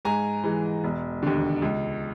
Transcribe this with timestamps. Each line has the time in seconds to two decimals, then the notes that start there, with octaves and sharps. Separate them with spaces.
0.05 G#2 G#5 A#5
0.44 E3 G#3
0.84 E1
1.23 D#2 D3
1.62 C#2